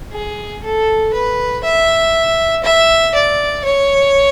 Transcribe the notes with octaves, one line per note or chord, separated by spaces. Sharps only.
G#4
A4
B4
E5
E5
D5
C#5